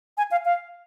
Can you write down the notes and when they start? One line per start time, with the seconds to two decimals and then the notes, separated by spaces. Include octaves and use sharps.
0.18 G#5
0.31 F5
0.45 F5